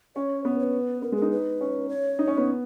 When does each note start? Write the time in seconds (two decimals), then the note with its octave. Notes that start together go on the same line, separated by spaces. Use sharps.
0.16 C#4 C#5
0.44 B3 B4
0.60 C#5
0.64 B4
1.02 B3 A#4
1.12 G#3
1.17 A#4
1.22 D#4
1.31 B4
1.61 C#4
1.89 C#5
2.19 D#4
2.27 C#4
2.37 B3